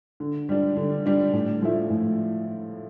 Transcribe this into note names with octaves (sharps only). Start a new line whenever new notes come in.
D3
G3 D4
D3
G3 D4
A2
F3 A3 E4
A2